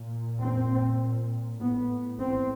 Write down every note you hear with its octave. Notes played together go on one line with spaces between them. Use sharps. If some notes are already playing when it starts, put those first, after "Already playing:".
Already playing: A#2
C4
A2 B3
C4